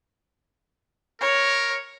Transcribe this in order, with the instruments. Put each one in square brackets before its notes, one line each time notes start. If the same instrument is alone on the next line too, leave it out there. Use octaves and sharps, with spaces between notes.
[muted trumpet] A#4 [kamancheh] C#5